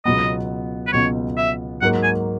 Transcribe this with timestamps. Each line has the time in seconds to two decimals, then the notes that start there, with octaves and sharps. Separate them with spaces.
0.05 C#2 B2 F#3 B3 D#5
0.87 B4
0.93 C#2 B2 F#3 B3 C#5
1.38 E5
1.82 G#2 F#3 A#3 F#5
2.03 G#5